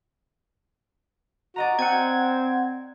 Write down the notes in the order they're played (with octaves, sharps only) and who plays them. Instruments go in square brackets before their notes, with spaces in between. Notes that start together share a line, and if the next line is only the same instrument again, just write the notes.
[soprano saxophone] F#4 [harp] D5 D#5 A#5
[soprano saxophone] C4 [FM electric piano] F#5 G#6 [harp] G#5